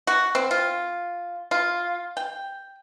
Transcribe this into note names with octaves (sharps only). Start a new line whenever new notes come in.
F#4
C4
F4
F4
G5